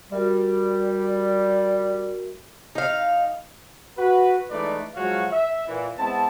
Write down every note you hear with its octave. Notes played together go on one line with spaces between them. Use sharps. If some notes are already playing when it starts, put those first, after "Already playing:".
G3 F#4 A#4 E5
D#4 F5
F#4 B4
E3 G#3 A3 D#4 B4 D5
F3 F#3 G#3 F#4 C#5 F5
E5
A#2 E3
G#3 B3 C4 E4 A5